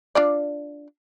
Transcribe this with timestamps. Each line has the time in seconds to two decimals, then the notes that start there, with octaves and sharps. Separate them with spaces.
0.15 D4 F4 D5